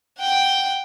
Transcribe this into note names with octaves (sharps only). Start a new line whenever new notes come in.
F#5 G5